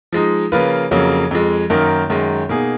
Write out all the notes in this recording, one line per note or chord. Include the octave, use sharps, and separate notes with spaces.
F3 G#3 D#4
C#3 F3 A#3 F4 B4
F2 C#3 F#3 A#3
F2 F3 G#3
F#2 D#3 A#3 D#4 A#4
F#2 D#3 G#3
B2 A#3 D#4 G#4